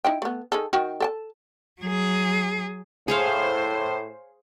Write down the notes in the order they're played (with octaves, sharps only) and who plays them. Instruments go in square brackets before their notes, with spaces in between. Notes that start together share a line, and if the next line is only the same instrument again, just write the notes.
[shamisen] D#4 E4 G5
A3 B3
D#3 G#4 A4
D#3 F#4 G5
A4 G5 A5
[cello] F#3 G#4
[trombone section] A2 [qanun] G#4 C#5 F5 [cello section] C5